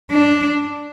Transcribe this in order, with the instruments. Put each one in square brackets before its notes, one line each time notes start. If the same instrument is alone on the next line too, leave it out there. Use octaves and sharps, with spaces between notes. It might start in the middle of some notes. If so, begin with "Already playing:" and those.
[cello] D4